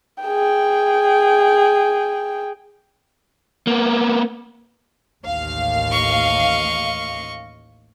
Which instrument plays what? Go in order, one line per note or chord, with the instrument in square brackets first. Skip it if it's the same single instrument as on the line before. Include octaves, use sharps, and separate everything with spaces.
[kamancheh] G#4 G5
[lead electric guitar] A#3 B3
[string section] A1 D#2 F5
[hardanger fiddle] D#5 C#6